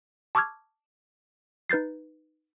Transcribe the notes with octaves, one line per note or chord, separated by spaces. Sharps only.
A5 C#6 D6 E6 F6 G#6
D#4 B4 G6 A6 C7